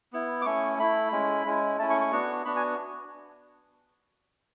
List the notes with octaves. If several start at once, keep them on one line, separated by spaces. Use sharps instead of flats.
B3 E4
D6
A3 C#4 E4 C#6
A3 E4 B5
G#3 C#4 E4
G#3 C#4 E4
A3 C#4 E4 A5
C#6
C#6
B3 D4 F#4
B3 D4 F#4 B5
G#5